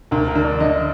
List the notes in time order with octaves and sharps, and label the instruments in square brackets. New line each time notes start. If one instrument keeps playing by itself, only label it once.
[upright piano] D2 [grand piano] A#4
[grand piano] A#4
[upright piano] D3
[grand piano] D5
[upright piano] D3 [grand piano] D#5